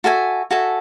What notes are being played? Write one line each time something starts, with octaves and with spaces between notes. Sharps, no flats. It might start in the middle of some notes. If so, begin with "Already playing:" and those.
F#4 A4 E5 G#5
F#4 A4 E5 G#5